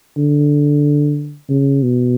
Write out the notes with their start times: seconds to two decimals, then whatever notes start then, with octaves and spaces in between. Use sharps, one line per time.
0.17 D3
1.50 C#3
1.83 B2